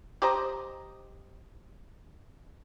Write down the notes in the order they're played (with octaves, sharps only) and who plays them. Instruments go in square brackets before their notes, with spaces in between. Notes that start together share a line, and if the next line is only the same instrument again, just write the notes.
[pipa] G4 C5 D#5 A#5